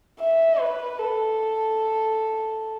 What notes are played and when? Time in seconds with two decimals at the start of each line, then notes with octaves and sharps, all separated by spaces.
0.19 E5
0.60 B4
0.99 A4